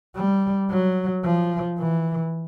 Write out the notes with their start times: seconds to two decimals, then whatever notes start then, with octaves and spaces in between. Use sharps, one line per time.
0.16 G3
0.70 F#3
1.24 F3
1.79 E3